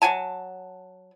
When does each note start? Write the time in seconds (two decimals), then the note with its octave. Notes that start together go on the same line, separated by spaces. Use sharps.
0.02 F#3 F#5 G#5 A5